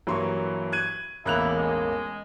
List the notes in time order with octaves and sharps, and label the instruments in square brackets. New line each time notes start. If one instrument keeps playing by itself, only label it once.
[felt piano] G2 C6 C#6 [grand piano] E3 F#3 A#3
[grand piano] F#6 G#6 D#7
[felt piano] E1 A#3 A#4 [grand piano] A1 F#6 F7 [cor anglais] E4
[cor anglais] G#3